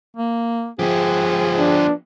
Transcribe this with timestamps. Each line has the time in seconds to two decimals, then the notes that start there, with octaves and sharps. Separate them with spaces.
0.17 A#3
0.79 F3 B3 G4 G#4
1.58 D4